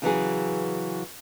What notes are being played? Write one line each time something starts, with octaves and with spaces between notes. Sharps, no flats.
C#3 E3 F#3 G#4